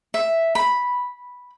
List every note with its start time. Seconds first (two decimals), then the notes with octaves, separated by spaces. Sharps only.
0.14 E5
0.55 B5